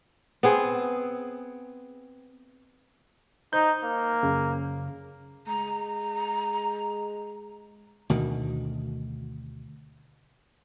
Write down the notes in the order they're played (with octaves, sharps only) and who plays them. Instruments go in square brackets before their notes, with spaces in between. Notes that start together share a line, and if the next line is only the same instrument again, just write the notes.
[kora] B3 C4 G#4
[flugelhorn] D#4 [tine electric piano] C5 G6
[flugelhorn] A#3
[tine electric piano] F#2 C#3
[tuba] G#3 [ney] A#5
[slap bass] D2 B2 D#3